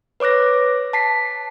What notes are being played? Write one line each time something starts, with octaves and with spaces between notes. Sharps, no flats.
B4 C#5 D6 F#6 A#6
A5 B6 C7